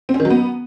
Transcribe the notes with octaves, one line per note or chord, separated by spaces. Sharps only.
C4
C#4
D#3
F#3
B3